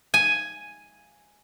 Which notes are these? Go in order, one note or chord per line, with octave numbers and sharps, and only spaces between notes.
G#5